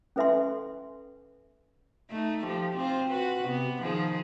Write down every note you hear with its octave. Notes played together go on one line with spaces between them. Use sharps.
C#4 A4 B4 E5 G#5 C6
A3 D#4
F3 G4
C4 F4 C5
F#4 B4
C3 B3
D#3 F3 G#4